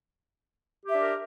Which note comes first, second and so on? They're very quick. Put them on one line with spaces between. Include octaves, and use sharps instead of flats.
G4 E5 D4 A#4